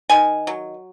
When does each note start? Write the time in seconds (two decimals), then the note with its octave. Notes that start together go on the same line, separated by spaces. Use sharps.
0.10 D#3 G#5
0.47 F#3